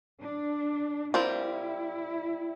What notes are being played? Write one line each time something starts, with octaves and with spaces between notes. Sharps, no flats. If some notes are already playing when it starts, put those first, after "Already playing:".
D4
G3 C4 E4 F4 A#4